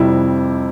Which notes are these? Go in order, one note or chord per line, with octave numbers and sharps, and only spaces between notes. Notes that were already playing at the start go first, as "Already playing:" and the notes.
Already playing: F2 C3 G3 E4